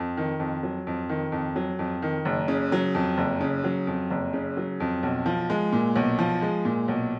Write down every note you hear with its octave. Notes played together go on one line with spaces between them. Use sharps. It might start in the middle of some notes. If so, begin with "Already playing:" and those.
Already playing: F2
D#3
F2
F#3
F2
D#3
F2
F#3
F2
D#3
F#1
C#3
F#3
F2
F#1
C#3
F#3
F2
F#1
C#3
F#3
F2
B1
F3
G#3
A#2
B1
F3
G#3
A#2
B1